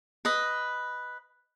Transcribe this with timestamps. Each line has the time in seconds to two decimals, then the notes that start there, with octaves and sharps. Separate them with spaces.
0.25 B4 D#5